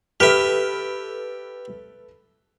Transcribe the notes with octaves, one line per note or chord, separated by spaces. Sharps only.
G4 A4 B4 E5 F6